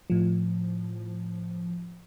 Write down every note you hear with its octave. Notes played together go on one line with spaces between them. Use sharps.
A2 F3